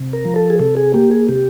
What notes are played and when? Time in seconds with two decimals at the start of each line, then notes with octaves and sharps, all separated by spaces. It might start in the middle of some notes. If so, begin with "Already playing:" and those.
Already playing: C3
0.13 A#4
0.25 F3
0.36 A4
0.50 G#4
0.59 C3 A4
0.77 G#4
0.94 A#3 G4
1.11 G#4
1.29 C3 G4